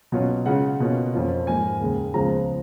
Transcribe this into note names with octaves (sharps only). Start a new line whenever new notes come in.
B2 F#3 C#4 F4
C#3 G#3 C#4 F4 F#5
B2 A#3 C#4 F4
F2 F3 A#3 C#4 F4
G#2 F3 A#3 G#5
D#2 C#3 G#3
C#2 C#3 F3 G#3 B3 A#5